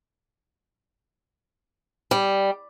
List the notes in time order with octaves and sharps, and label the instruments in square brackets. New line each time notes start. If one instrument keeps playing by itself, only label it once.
[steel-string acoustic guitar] G3